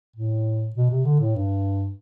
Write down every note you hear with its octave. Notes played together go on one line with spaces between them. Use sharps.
A2
B2
C3
D3
A2
G2